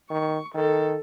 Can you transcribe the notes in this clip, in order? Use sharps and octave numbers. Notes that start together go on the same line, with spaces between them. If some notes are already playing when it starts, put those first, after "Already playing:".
D#3 C#6
D#3 A4